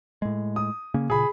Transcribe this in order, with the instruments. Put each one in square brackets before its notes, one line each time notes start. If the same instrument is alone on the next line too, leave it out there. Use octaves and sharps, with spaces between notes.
[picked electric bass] A2 G#3
[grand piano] D#6
[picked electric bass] C#3 A#3 C#4
[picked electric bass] A#2 C#3 [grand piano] G#4 B5